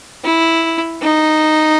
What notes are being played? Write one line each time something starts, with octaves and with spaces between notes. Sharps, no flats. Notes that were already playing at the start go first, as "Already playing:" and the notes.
E4
D#4